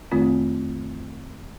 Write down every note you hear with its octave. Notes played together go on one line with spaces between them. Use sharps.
F2 D#3 A3 C4 F4